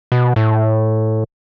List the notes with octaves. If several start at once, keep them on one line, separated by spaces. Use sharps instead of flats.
B2
A2